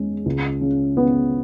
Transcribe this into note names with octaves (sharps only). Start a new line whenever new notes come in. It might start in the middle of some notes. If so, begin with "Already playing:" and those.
Already playing: E2 G#3 C#4
C#2
C#3
B3